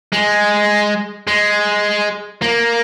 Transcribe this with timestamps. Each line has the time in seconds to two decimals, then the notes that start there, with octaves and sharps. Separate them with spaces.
0.13 G#3
1.28 G#3
2.42 A#3